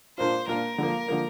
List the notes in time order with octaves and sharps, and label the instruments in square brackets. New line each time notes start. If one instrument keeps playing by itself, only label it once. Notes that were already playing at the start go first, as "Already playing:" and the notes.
[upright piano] A#2 A#3 D4 F4 [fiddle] C5
[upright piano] A#2 A#3 D4 F4 [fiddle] A#4
[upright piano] D3 F3 A#3
D3 F3 A#3